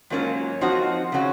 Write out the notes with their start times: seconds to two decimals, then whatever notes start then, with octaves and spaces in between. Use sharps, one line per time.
0.10 G#2 F#3 A#3 C#4 F4
0.61 F3 C4 D#4 F#4
1.12 C#3 F#3 C#4 F#4